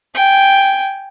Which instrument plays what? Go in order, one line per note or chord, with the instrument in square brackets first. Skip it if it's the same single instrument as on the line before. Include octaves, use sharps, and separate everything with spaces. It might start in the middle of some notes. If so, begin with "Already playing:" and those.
[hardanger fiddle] G5 G#5